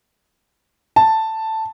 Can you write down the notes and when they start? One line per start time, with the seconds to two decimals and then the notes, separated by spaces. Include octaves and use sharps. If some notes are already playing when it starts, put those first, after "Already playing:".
0.96 A5